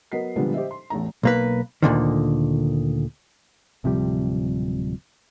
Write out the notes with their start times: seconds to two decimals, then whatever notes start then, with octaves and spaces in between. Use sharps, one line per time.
0.12 F#3 B3 A#4 D#5 B6 C7
0.36 A#2 D3 F3 G3 G#3 B3
0.54 G4 C5 D#5 E5
0.71 C6
0.90 A1 E2 A3 A#5
1.23 B1 A#3 B4
1.83 D2 A#2 D3 D#3
3.84 D1 C3 F3 G3